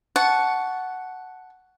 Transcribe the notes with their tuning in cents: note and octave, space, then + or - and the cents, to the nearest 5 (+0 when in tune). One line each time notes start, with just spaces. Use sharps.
F#5 +0 A5 -10 C#6 +10